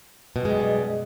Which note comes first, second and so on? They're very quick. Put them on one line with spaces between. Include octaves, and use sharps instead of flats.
B2 F#2 G#3 G3